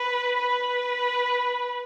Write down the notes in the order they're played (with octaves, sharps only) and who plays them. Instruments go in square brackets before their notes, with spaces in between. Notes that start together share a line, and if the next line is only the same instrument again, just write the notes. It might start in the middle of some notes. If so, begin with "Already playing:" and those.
Already playing: [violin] B4
B4